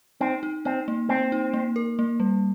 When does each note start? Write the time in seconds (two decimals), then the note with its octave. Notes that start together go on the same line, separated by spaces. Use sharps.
0.21 C4 D#4
0.43 D#4
0.65 C4 D#4
0.88 A#3
1.09 A#3 C4
1.32 D#4
1.54 A#3
1.76 A#4
1.99 A#3
2.20 G3